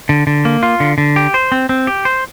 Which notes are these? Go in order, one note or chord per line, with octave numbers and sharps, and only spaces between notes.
D3
D3
A#3
F4
D3
D3
G4
C5
C4
C4
G4
C5